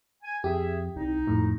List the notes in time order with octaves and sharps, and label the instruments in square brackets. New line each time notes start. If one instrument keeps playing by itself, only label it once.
[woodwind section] G#5
[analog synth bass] F2 [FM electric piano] G4 [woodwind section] G#4 E5
[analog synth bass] C2 [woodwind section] D#4
[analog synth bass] F2 [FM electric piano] A2